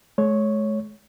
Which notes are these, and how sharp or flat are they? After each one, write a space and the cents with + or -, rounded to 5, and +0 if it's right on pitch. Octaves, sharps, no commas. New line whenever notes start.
G#3 +45 C#5 +0